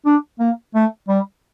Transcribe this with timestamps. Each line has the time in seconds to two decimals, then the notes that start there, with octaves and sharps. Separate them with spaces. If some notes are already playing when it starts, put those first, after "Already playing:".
0.05 D4
0.39 A#3
0.75 A3
1.08 G3